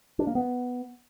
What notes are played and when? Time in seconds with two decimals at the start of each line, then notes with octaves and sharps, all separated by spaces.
0.19 D4
0.27 A#3
0.35 B3